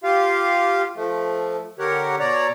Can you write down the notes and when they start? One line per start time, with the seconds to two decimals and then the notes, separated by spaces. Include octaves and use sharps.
0.04 F4 G4 F5
0.96 F3 A3
1.79 D3 G4 A#4 C#5 F#5
2.20 B2 C#5 D5 A#5